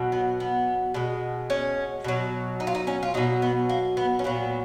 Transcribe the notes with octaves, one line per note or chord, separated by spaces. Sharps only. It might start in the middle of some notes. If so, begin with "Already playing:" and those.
Already playing: B2 F#3
B3
B3
B2 G#3
C#4
B2 F#3
D#4
F4
D#4
C#4
F4
B2 F#3 D#4
B3
A#3
B3
C#4
A#2 F#3 B3